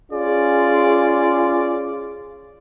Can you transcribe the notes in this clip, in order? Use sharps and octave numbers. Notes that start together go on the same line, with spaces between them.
C#4 F4 G#4 D5